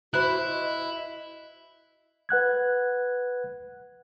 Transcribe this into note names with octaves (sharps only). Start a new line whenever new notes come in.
E4 F#4 C5 B5 F#6
D#5
B4 F#5 F#6 G#6